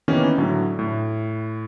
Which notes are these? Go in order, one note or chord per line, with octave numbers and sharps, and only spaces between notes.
D#3 E3 A#3 B3 C#4 G4
A2 D3 F#3
A2